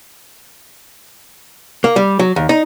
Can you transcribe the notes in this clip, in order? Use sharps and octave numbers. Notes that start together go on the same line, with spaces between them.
A#3
G3
F#3
D#2
D#4